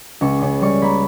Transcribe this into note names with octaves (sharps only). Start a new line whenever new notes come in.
C#2 C#6
C#3 C#6
G3 C#6
A#3 B5